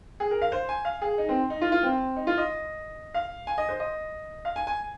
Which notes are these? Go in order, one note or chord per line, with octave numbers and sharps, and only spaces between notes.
G#4
A#4
F5
C5
G#5
F5
G#4
D#4
C4
D#4
F4
F4
C4
D#4
F4
D#5
F5
G#5
D#5
C5
D#5
F5
G#5
G#5